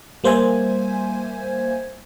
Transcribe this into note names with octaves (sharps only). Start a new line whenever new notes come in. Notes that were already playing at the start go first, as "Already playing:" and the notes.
G3 A#3 C5 E5 G#5 G#6